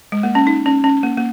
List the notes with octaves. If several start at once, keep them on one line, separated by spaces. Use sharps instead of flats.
G#3
A#3
C#4
D#4
C#4
C#4
A#3
A#3